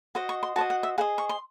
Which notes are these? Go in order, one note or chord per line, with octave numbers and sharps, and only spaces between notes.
F#4 C5 D#5
C#6
C6
F#4 C5 D#5 A5
F#5
E5
G#4 C5 D#5 F#5
C#6
C6